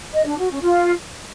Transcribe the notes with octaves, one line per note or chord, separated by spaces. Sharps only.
D#5
D4
F#4
C#4
F4